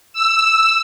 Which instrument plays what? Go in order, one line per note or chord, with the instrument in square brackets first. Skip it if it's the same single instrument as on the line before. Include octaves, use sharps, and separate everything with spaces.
[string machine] E6